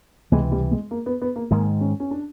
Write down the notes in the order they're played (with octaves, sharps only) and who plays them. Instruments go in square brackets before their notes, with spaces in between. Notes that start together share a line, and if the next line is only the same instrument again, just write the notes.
[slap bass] C#2 C3 E3 [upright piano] G#3
[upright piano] G3
G#3
A#3
B3
B3
A#3
[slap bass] G#2 D#3 G#3 [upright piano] A#3
[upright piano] C#4
C#4
D4